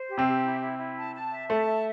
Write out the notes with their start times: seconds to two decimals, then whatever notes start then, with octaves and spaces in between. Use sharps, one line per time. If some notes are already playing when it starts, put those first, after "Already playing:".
Already playing: C5
0.09 G4
0.18 C3 C4
0.26 G4
0.44 E4
0.62 E4
0.79 E4
0.97 A5
1.15 A5
1.32 E5
1.49 A3 A5
1.66 E5